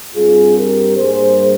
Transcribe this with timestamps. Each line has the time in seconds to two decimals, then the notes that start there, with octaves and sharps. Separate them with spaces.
0.15 G2 G3 C4 F4 G#4
0.57 G4 A#4
0.97 G2 G3 A#3 G#4 C5